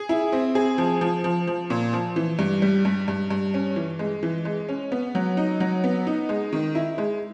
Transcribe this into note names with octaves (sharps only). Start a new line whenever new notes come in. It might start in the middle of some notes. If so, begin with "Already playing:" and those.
Already playing: G#4
E4
C4
G#4
F3
F3
F3
F3
A#2
F3
E3
G2
G3
G2
G2
G2
C#4
E3
G#3
E3
G#3
C#4
B3
F#3
D#4
F#3
B3
D#4
G#3
D#3
E4
G#3